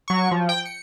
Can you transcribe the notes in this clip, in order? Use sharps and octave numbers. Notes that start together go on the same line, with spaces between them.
F#3 C#6
F3
G5
C#7